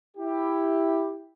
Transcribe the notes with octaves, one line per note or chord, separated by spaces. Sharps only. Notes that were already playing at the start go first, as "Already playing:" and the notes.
E4 G4